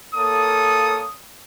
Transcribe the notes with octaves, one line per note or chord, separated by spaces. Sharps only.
A#3 A4 C#5 D#6